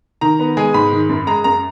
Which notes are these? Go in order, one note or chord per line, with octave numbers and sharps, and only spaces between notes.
D#3 A#5
B3
G#3 G#5
G#2 B5
D#3
F#2
G#3 A#5
F#2 A#5